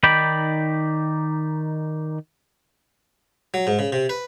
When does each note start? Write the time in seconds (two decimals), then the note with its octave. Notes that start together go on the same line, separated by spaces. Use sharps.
0.03 D#3 D#4 D5 G5 B5
3.54 F#3
3.67 G#2
3.79 C#3
3.93 C3
4.09 B4